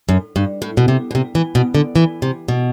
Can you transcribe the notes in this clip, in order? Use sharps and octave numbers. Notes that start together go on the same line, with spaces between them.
F#2
G2
A2
B2
C3
B2
C3
E3
B2
D3
E3
C3
B2